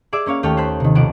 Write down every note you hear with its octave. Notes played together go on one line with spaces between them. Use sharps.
G#4 D5 E5 D6 E6
A#3 C#4 C#5 F5
D#2 A3 A4 C#5 G5 F6
C5 A5 C6 F#6 G6 B6
C3 D#3
B1 F3 F#5 D7